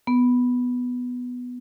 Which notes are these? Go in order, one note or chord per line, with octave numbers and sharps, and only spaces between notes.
B3